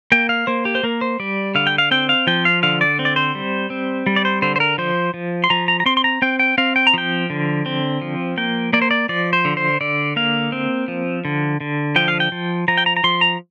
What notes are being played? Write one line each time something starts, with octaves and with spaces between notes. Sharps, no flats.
A#3 G5
F5
A#3 C5
G4
C5
A#3 A#4
C5
G3 D5
D3 F5
G5
F5
C4 G5
F5
F3 G5
F5
D3 F5
D5
C4
D5
C5
G3
C4
G3
D5
C5
D3 C5
C5
A#4
F3 C5
F3
C6
F3 A#5
A#5
A#5
C4 C6
C6
A#5
C4 G5
G5
C4 F5
G5
A#5
F3 G5
D3
C4
F3
A#3 G5
A#3 D5
C5
D5
F3 D5
C5
D3
C5
D3 D5
A#3 F5
C4
F3
D3
D3
F3 G5
F5
G5
F3
F3 A#5
G5
A#5
A#5
F3 C6
A#5